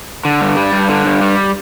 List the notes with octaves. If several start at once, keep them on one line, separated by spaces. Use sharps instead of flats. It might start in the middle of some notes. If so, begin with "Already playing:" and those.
D3
G2
G3
G2
D3
G2
G3